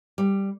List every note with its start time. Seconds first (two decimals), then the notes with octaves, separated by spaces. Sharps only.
0.18 G3